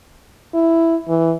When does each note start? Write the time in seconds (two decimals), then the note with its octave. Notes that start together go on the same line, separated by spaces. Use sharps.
0.54 E4
1.08 E3